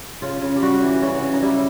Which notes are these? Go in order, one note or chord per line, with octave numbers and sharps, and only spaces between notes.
C#3 F4
C#3
G4
G3 F#4
E3
C#3 F#4
C#3
D#4
G3 E4